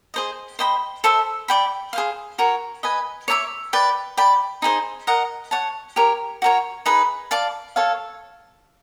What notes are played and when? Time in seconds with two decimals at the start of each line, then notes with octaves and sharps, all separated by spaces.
0.14 G#4 C5 D#5
0.59 C5 D#5 G5 B5
1.04 A4 C5 E5
1.48 D5 G5 B5
1.93 G#4 C5 F5
2.38 F#4 A#4 C#5
2.83 B4 D#5 G#5
3.28 C#5 E5 A5 D6
3.73 B4 D5 G5
4.17 D5 G5 B5
4.62 D#4 G#4 C5
5.07 A#4 D#5 F#5
5.51 C#5 F#5 A5
5.96 G4 A#4 C#5
6.42 F#4 A#4 C#5
6.86 D#4 G#4 B4
7.31 D5 F5 A5
7.76 A4 C#5 F5